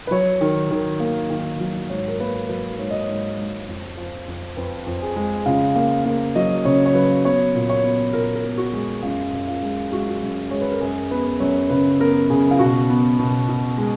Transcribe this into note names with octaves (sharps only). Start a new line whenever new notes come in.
B4
F#3 C#5
D#3
D#3
A#3
D#3
F#3
G#2 C#5
A#4
A#3 B4
F#3 B4
G#2 C#5
D#5
G#2 C#5
G#2
F2
F3
F2
F2 B4
F2
G#4
G#3
C#3 F4
A#3
A#3
F#3 D#5
C#3 C#5
C#5
F#3 B4
B3 C#5
A#2
C#5
B3
A#2 A#4
A#4
B3
F#4
G#3
F#2 F4
F#2
F4
G#3
G#3 F#4
F4
F#4
F#2
G#3 C#5
B4
A#4
F#2 G#4
B3 B4
F#2 C#5
C#3 B4
B3 A#4
C#3 G#4
F4
B2 F#4
B3
B2
B2
G#3